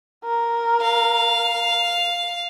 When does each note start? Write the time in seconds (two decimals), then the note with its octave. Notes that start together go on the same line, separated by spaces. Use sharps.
0.24 A#4
0.82 F5